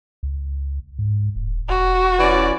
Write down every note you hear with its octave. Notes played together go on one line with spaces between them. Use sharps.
C#2
G#2
D#1
E1 F#4
E3 C#4 D5